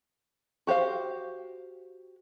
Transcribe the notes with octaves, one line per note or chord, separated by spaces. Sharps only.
F#4 G4 C5 F5